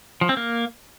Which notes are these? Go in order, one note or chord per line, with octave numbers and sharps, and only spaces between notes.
F3
C4
A#3